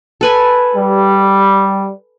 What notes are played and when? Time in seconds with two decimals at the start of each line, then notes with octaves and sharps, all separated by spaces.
0.21 A4 B4 G#5
0.76 G3